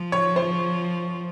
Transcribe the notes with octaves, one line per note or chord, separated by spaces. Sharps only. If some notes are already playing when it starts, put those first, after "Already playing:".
Already playing: F3
C#5
C5